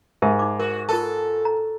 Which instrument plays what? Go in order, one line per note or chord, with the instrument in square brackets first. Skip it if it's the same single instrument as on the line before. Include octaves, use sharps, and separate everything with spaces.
[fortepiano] G#2 [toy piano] G4 A#4 E5
[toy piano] D#4 D6
[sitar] F#4 [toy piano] A#4
[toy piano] F4 A#4 A5 [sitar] A4
[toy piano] A#5